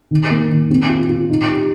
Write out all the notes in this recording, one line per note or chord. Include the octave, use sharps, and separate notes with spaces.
D#3
A#3
D#3
C4
F4
F4
D#4
G4